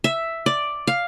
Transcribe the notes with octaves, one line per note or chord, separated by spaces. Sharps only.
E5
D5
F5